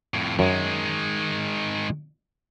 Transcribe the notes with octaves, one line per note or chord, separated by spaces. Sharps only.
F2 A2
F#2 D#3 G#3